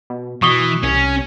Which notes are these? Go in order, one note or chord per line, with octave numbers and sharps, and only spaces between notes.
B2
B2 E3 C#6 D#6 G7
C2 C#4